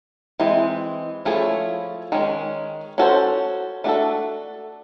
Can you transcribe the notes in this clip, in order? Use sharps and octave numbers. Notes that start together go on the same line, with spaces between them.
E3 G#3 C4
F3 A3 C#4 E4 G#4
D#3 G#3 C#4
C#4 F#4 A4 C5
A3 D4 F#4 A4